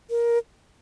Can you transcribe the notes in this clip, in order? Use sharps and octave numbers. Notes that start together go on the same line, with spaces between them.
A#4